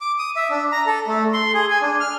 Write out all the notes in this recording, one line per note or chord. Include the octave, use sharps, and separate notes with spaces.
D6
D#6
E5
D4
A#5
A4
A3
C6
G#4
G#5
D4
F6